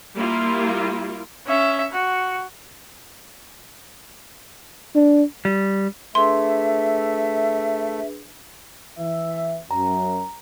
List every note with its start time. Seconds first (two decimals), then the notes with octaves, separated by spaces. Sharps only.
0.16 G3 A#3 E4 F4
1.47 C#4 E5
1.93 F#4
4.95 D4
5.45 G3
6.15 A3 D4 G#4 B4 E5 C6
8.98 E3 E5
9.71 F#2 A#5